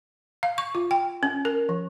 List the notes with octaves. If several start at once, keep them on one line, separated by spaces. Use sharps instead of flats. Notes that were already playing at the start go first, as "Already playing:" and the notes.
F5
C#6
F4
G5
C#4
A#4
F3